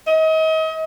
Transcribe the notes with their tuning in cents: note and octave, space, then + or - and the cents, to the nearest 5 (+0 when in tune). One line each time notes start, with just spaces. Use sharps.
D#5 +35